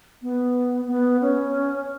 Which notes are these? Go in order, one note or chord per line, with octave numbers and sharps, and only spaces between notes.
B3
B3
C#4